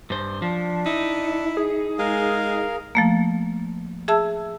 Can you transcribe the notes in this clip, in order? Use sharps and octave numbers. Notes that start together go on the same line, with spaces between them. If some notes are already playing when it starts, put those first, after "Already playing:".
G2 C5
F3 D4
D#4 E4
G#4
G#3 A#4 F5
F3 A3 A#3
G#4 E5 A5 E6